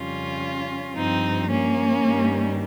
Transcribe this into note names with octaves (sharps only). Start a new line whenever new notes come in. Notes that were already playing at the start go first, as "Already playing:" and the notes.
Already playing: F2 C#3 G3 C#4 F4
G2 F3 C4 D#4
A#3 C#4
G2 D#3 G3